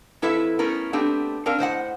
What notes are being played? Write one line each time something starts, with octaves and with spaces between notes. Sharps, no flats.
F2 E4 A4 B4 E5
A3 B3 C#4 A#4
A3 B3 C4 D4 G4
C4 D4 A#4 F5
A2 C5 D#5 F#5